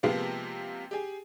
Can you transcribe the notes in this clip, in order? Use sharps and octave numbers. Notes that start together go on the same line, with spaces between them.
C3 F3 G#3 A#3 B3
G4 G#4